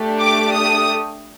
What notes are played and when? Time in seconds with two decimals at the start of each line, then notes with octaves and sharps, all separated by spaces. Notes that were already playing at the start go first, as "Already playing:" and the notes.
Already playing: A3 D4 G4
0.20 D6
0.52 D#6